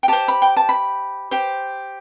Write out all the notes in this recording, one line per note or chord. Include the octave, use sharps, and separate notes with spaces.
G5
G4 C5 A5
B5
G5
A5
B5
G4 C5